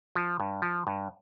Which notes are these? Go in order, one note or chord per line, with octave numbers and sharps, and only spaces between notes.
F3
G2
F3
G2